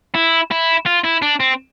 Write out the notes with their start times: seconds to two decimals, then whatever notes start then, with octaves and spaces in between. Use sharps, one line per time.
0.15 E4
0.51 E4
0.86 F4
1.04 E4
1.22 D4
1.40 C4